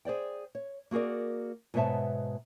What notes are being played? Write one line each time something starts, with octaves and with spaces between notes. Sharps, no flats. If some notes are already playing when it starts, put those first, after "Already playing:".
G#4 C5 D5 G5
C#5
A#3 F#4 G#4 A#4 D5
G#2 B2 B3 C#5 E5 A5